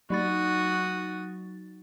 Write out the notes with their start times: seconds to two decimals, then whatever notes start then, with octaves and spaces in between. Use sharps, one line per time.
0.10 F#3 D#4 F#4 D#6 A6